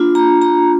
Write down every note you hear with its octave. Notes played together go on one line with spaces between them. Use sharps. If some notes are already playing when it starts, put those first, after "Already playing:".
Already playing: A#3 D4 F4
A#5
A#5